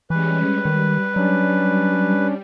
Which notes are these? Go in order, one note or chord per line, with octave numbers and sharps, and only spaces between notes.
E3 G3 G#3 C#4 B4
D#3 G3
F#3 C#4 D4